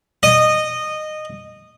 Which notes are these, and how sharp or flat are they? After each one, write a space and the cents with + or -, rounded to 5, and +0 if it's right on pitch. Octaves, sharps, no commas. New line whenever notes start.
D#5 -15